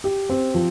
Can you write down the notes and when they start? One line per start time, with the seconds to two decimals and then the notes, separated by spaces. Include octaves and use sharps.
0.04 G4
0.30 C4
0.54 F3